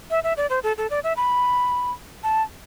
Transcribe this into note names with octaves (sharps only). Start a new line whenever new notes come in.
E5
E5
D5
C5
A4
A4
D5
E5
B5
A5